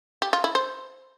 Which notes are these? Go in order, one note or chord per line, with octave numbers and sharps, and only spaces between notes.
G4
F4
E4
C5